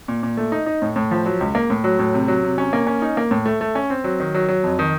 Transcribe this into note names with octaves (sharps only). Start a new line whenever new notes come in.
A#2
A#2
A3
D#4
D#4
A2
A2
F3
F#3
C#2
A#3
A2
F#3
A2
C3
F#3
C3
C#4
A#3
C#4
D#4
A#3
A2
A3
A3
C#4
C4
F#3
D#3
F#3
F#3
F2
D#3